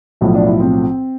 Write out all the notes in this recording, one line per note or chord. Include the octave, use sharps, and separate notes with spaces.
B1 A2 F3 E4
D4
E4
C4